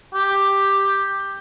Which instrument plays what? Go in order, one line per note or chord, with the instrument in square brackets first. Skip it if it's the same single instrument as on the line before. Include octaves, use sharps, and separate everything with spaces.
[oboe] G4